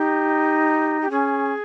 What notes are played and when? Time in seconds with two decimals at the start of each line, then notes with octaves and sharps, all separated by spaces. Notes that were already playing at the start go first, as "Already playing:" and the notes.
Already playing: D#4 G4
1.02 G4
1.10 C#4 G#4